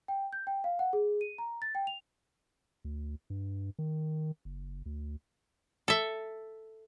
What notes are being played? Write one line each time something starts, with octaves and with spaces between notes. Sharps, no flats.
G5
G6
G5
F5
F#5
G#4
D#7
A#5
A6
G5
F7
D2
G2
D#3
F#1
D2
A4 E5